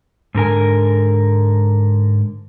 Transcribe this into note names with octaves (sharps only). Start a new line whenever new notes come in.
G#2 D3 A#4 G#5